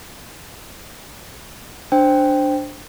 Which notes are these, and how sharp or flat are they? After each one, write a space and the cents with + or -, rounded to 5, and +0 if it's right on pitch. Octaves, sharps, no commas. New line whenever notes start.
D4 +0 C5 +0 G5 +0